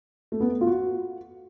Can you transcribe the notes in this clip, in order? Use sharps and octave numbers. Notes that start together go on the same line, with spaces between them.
A3
B3
A3
F4
F#4